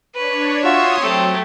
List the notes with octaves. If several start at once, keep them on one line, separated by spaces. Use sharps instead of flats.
D4 B4 C#5
F4 F#4 C#5 E5 C6 D#6
F#3 A3 C4 G4